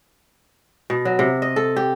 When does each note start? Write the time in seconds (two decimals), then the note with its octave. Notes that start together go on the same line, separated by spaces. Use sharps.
0.90 B2
1.05 F#3
1.19 C3
1.42 D#5
1.56 A4
1.76 G4